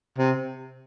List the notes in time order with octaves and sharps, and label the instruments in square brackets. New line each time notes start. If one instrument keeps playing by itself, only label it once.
[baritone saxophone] C3